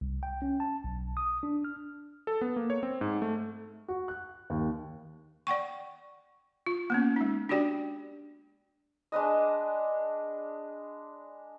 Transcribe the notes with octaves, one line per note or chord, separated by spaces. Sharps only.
C2
G5
C#4
A5
B1
D#6
D4
F6
A4
B3
A#3
C#5
C4
G#2
A3
F#4
F#6
D#2
D5 F#5 G5 C#6
F4
A#3 B3 C#4
G#3 D#4
D4 F#4 G4 D5 G5
G#3 D4 B4 D#5